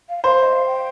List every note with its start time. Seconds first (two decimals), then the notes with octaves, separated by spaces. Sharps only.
0.09 F5
0.24 C5 F5
0.43 D#5
0.52 F5
0.67 G5